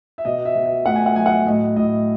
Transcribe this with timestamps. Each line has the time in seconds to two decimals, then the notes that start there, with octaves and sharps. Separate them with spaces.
0.18 E5
0.25 B2 D#5
0.45 E5
0.56 B2
0.66 E5
0.86 A3 F#5
0.96 G#5
1.06 F#5
1.16 F#3 G#5
1.26 F#5
1.46 A2 D#5
1.76 A2 D#5